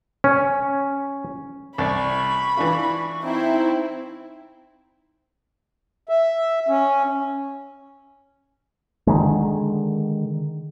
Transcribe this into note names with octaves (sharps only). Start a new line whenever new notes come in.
C#4
C2 D5 B5 C#6
E3 D4 F4
C4 D#4 E4
E5
C#4
D3 D#3 G#3